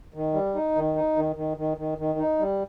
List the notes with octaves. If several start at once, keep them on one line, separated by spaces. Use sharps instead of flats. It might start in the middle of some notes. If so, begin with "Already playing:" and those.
D#3
G3
D#4
D#3
D#4
D#3
D#3
D#3
D#3
D#3
D#4
G3